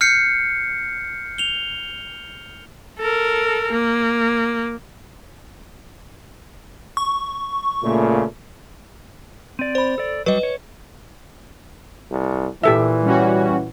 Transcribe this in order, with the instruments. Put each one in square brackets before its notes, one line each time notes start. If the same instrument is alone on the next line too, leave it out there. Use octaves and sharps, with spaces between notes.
[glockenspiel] F6 G6 C7 C#7
F7 G7
[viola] A4 A#4
A#3
[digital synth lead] C#6
[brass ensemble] A#2 C#3 A3
[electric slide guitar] C4 D5 [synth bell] D#7
[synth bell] C5 B5
[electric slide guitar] A4 D5
[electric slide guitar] F#3 G3 [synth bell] B4 D#5
[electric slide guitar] C#5
[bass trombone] C2
[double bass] A#2 [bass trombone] E3 [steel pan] G4 A4 E5
[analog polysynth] G3 C#4 F#4